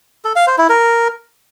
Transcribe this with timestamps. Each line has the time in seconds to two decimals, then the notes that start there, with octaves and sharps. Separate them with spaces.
0.25 A4
0.36 F5
0.47 C5
0.58 E4
0.69 A#4